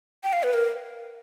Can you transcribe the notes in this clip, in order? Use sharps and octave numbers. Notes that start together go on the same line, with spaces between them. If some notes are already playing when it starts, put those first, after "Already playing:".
G5
F5
B4
A#4